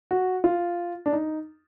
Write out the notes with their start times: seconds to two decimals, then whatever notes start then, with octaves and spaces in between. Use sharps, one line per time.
0.11 F#4
0.44 F4
1.06 D4
1.13 D#4